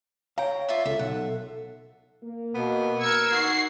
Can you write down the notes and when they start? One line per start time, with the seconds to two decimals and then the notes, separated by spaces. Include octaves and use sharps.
0.38 C#5 F5 G5 A#5
0.68 F4 D5 E5
0.86 C#2 A4 E5
0.99 B1 F#5
2.23 A#3
2.55 B2 B3
3.01 A#4 E6 G#6 C#7
3.32 D#4 F#4 C7